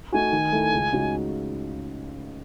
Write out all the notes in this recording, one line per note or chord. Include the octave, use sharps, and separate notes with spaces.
A3 D#4 F#4 G#5
D#3
A3 E4
C#2
C#3 G#3 D#4 F#4